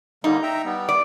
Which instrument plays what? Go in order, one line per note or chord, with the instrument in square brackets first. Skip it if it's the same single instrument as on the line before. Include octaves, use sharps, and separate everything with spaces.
[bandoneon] D3 G3 A#3 [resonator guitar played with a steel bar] D#4
[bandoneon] E5 G5 A#5
G3 B3
[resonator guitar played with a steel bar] D5